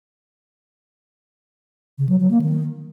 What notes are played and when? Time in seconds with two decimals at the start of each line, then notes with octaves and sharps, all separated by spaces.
1.98 C#3
2.09 F#3
2.20 F#3
2.31 A#3
2.42 D#3